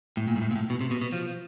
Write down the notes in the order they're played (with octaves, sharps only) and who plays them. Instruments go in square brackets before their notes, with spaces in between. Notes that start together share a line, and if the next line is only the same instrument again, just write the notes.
[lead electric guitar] A2
A#2
G#2
A2
A#2
A2
B2
C3
B2
B2
F3